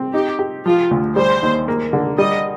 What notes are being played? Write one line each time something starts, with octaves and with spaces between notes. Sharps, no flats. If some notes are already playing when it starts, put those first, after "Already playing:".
Already playing: C4
D#4 G4
G4
F3 F4
D2
G3 C5
D#2
A#3
D3
G3 D#5